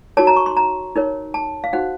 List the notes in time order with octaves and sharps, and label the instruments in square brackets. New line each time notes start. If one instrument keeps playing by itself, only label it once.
[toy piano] D#4 F#4 A#4 C#5 A5
A#5
C#6
C6
A#5
D#4 A#4 C#5
A5
F5
D#4 F#4 C5 F#5